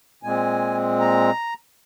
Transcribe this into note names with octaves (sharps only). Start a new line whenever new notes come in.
A#2 G#3 C4 G#5
A#5